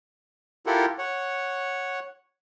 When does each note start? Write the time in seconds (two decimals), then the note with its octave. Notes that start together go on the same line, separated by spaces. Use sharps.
0.66 E4 F4 G4 A4 A#4 F#5
0.99 C#5 F#5